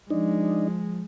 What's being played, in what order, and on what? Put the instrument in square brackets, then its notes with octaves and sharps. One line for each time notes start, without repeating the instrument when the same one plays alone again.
[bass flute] F3 [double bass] G#3 [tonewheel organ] D4 D#4